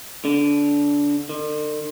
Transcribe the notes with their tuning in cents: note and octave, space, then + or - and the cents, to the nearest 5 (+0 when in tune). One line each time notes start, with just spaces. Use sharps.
D3 -20
D3 +45